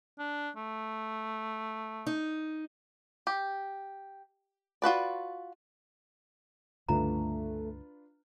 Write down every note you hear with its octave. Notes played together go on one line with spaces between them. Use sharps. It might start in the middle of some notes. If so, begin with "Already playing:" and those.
D4
A3
D#4
G4
F4 F#4 B4 D5
C#2 G2 D3 A3 D4 F4 B4 A#5